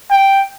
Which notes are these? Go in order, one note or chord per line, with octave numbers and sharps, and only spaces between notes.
G5